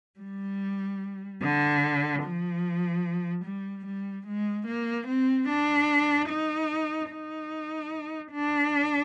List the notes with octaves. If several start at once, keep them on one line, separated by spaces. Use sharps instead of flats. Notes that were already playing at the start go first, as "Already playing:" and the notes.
G3
D3
F3
G3
G3
G#3
A#3
C4
D4
D#4
D#4
D4